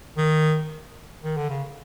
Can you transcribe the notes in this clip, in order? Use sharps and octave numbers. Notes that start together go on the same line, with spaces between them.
D#3
D#3
D3
C#3